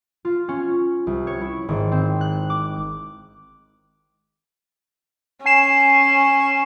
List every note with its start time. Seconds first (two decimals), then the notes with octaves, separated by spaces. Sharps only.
0.25 F4
0.49 C#4
1.07 C2
1.27 C#5
1.41 E4
1.69 G#1
1.92 C4
2.21 F#6
2.50 D6
5.45 C#4 G#5 C7 E7